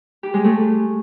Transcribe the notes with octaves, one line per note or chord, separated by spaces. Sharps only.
G4
G#3
A3